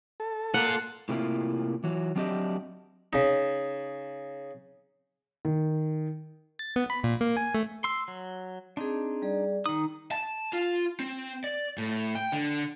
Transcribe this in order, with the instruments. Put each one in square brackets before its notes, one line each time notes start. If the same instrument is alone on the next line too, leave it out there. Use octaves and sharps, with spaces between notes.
[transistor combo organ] A4
[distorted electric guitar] A#2 F4 [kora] F#5
[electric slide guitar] A2 C3 A3 A#3 E4 F4
E3 F#3
F#3 C4 D4 G4 D#5 E5
[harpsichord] C#3 D#4
[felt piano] D#3
[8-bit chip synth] A6
B3
B5
A#2
A#3
G#5
A3
[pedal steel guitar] C6 E6
F#3
[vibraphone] C4 G#4 [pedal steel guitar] D4 D#4
[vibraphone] G3 G#4 D5
[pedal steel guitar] D#3 D#6 [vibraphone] D#4 A#5
[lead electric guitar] A5
F4
C4
D5
A2
G5
D3